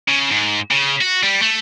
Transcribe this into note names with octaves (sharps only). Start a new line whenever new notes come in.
C#3
G#2
C#3
F#4
G3
A3